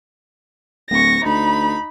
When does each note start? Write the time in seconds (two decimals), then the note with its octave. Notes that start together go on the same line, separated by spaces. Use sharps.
0.90 D1 C#6 A#6
1.25 D2 D#4 B5